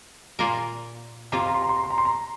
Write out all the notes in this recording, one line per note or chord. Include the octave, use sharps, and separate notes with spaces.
A#2 A#3 F4 A#4
C3 A#3 F4 A#5
C6
A#5
C6
A#5
C6
A#5
C6
A#5
C6
A#5